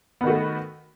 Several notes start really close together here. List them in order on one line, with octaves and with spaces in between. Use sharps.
B3 D#3 F#4 A3